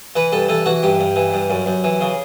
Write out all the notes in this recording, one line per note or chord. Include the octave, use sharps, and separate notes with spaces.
E3 B4
G2 A4
E3 A4
E3 F#4
G2 G4
G2
E3
G2
F#2
F#2
E3
C#3